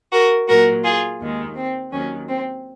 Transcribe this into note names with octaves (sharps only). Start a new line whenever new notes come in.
F#4 A#4
A#2 F#3 F#4 A#4
F4 G#4
D#2 D#3 G#3
C4
D#2 D#3 F#3 C#4
C4